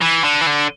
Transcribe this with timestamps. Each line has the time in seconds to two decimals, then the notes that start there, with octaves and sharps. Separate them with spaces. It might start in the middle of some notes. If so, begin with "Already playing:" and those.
0.02 E3
0.24 D3
0.41 E3
0.47 D3